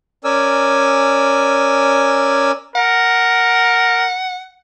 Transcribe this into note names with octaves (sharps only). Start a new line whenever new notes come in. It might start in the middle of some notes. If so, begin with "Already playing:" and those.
C#4 A#4 D5 G#5 E6
A#4 F#5